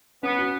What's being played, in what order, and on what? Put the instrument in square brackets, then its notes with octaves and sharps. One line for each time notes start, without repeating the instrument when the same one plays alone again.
[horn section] B3 [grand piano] C#4
[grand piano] F#4